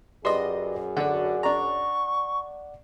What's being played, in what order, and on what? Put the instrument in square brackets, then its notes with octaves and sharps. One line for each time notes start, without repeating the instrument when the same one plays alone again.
[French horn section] F#2 G#4 [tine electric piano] G4 B4 D5 [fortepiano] D#5 C6
[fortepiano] D3 [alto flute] F#4 [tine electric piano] D5 F#5
[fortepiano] D4 A#5 [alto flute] C#6